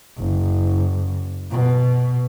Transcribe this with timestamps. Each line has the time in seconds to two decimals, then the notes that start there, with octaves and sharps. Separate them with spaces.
0.18 F#1
1.51 B2